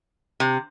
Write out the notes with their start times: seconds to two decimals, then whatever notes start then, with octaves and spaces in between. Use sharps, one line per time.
0.40 C3